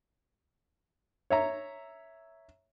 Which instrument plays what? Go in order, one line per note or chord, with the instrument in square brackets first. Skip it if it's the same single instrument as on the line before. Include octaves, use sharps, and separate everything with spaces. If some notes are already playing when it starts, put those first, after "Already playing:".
[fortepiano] C#5 E5 A#5